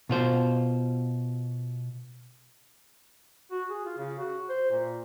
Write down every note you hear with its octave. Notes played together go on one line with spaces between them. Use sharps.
B2 F4 C5
F#4
G#4
F4
C#3
F#4
C5
A#2